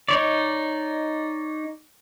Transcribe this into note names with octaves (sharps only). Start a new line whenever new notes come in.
D#4 C#5 D5